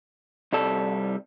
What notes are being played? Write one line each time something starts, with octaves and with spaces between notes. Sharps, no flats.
C2 G3 A4